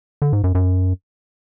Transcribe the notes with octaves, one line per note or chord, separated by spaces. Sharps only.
D3
G#2
F#2
F#2